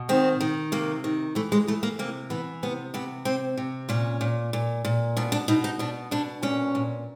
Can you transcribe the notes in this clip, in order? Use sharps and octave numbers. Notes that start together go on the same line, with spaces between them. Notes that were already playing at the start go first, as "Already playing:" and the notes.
Already playing: B2
D#3 C4
D#3
C3 A#3
D#3
E3 A3
G#3
E3 A3
A#3
C3 A#3
E3 B3
C3 B3
C3 B3
C3 C4
C3
A#2 C#4
A#2
A#2
A#2
B2 D4
D4
B2 D#4
D#4
B2 D4
B2 D4
A#2 C#4
A#2